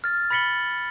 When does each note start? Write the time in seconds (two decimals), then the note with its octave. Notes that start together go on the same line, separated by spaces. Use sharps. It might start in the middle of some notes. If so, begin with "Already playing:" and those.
0.04 F6 A6
0.31 B5 A6 B6 C#7 F#7 G7